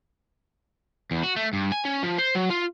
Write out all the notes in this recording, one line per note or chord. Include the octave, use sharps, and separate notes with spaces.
E2
F#4
A3
G2
G#5
C#4
F3
C5
F#3
F4